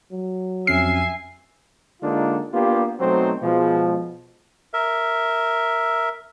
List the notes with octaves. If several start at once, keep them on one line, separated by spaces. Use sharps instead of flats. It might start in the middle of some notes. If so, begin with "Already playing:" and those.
F#3
F2 C#4 E5 G#5 F6 C7
D3 G#3 A#3 D4 D#4 F4
A#3 B3 D4 F4 G4
B2 F#3 A3 C4 D#4 C5
B2 F3 G#3
A#4 E5